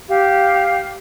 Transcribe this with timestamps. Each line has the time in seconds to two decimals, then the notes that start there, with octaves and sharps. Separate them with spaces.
0.08 G4 F5